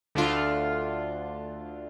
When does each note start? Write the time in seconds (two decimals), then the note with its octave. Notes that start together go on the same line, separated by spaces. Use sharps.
0.15 D2 D3 A3 D4 F4